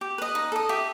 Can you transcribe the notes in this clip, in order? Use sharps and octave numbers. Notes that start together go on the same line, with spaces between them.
G4
B4 D#5
D#4
A4 D#5
G4 E5